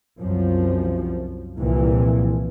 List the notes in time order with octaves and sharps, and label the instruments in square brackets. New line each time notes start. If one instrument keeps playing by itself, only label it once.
[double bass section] C2 F#2 F3
C2 A#2 E3 F3